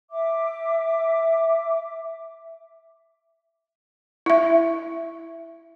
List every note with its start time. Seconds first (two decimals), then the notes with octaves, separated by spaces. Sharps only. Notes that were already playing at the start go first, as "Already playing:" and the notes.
0.10 E5 D6
4.26 E4 E5